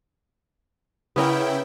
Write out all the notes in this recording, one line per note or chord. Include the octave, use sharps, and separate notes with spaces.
C#3 B3 C#4 E4 A#4 G5